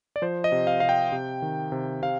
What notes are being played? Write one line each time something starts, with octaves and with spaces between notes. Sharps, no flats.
D5
F3 C5
D#5
C3
F5
C3 F5
G5
C3
D#3
C3
C3 F5